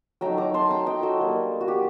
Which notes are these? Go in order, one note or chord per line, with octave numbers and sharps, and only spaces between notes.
F#3 A3 D#4 G5 A#5
A#5 D6
A5 C6
G5 A#5
D#5 G5
F#4 A4
G3 A#3 D4
F#4
G4